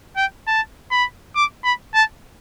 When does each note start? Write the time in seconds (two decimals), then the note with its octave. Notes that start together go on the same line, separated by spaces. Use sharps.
0.17 G5
0.47 A5
0.91 B5
1.36 D6
1.64 B5
1.94 A5